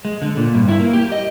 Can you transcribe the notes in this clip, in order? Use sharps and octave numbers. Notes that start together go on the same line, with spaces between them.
G#3
D3
A#2
G2
E4
A#3
G4
D#5